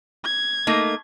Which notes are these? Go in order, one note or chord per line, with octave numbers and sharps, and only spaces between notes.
G#6
A3 A#3 D#4